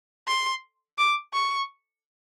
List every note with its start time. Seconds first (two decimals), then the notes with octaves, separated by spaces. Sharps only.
0.28 C6
0.98 D6
1.34 C#6